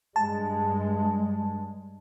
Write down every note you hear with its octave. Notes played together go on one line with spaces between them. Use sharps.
G2 G#3 A5